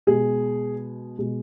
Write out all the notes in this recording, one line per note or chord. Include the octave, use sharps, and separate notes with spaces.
B2 G#3 G#4
B2 G#3